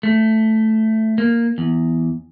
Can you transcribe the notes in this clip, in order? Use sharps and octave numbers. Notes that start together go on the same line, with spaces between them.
A3
A#3
E2